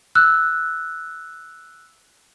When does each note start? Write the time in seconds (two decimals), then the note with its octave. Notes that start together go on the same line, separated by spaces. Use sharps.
0.15 E6 F#6